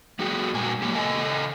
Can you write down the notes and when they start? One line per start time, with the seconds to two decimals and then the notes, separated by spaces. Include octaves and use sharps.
0.19 G3 A3 F#4 G#4
0.54 A#2 G3 G#3 G#5
0.82 F#3 A#3 G4
0.95 C#3 A4 D#5 G#5